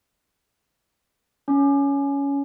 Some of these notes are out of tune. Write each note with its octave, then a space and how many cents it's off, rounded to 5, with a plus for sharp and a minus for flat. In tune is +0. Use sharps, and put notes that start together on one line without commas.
C#4 +15